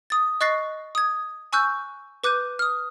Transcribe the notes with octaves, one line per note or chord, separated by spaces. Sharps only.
D#6 A6
D#5 C#6 F#6 A6 A#6 C7
D#6 G#6
G#5 C#6 E6 F#6 G6
B4 D6 F#6 G6 D#7
D#6 F6